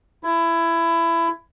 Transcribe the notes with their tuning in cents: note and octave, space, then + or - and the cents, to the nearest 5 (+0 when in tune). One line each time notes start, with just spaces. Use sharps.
E4 +20